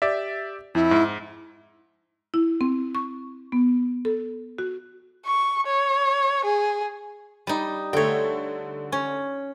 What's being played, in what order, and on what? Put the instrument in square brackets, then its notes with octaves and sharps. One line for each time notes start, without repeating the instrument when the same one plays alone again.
[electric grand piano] G4 D5 E5
[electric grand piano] F2 [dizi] E4
[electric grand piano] G#2
[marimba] E4
C4
C#6
B3
A4
F#4
[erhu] C#6
C#5
G#4
[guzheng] G3 D#4
[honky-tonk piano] D3 A3 [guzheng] C#5 G5
[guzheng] C#4